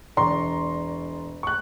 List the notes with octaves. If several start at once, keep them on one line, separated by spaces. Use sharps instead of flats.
E1 D5 A#5 C6 C#6
C#6 F#6